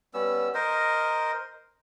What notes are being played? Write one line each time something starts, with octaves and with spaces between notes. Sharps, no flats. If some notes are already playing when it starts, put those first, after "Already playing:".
G3 B3 C#4 E6
A#4 C5 D#5